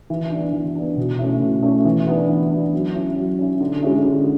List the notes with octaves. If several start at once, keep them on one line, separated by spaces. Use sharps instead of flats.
E3
B3 D4
E3
B3 D4
B2
A3 C#4 E4
B2
A3 C#4 E4
E3
B3 D4
E3
B3 D4
F#3
C#4 E4
F#3
C#4 E4
D3
G#3 C#4 E4
D3